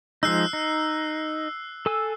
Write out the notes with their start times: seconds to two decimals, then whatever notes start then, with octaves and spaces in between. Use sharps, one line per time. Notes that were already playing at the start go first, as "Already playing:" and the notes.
0.23 F3 G#3 D#4 E6 F#6 C7
0.53 D#4
1.86 A4 G#5 E6